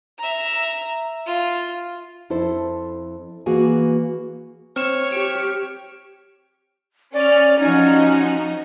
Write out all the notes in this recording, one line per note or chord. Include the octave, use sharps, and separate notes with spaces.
E5 A#5
F4
F2 E4 A4 C5
E3 A#3 F#4 G#4 G#5
C4 C#5 F6 E7
G4 D7
C#4 D5 F6
F3 C#4 D#4 F#4